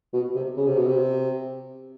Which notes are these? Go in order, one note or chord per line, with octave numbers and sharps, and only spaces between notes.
B2
C3
C#3
C3
B2
C3